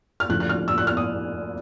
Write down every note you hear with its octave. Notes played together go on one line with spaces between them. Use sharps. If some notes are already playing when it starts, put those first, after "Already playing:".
F6
D2 C#3 F3 F#6
F#6
F6
E6
F#6
F6
D#6